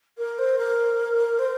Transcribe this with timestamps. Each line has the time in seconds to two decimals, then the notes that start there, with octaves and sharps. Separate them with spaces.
0.18 A#4
0.38 C5
0.58 A#4
1.39 C5